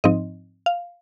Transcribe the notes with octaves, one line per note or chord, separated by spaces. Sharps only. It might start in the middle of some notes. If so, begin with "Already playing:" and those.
G#2 F3 C4 D#4 D#5
F5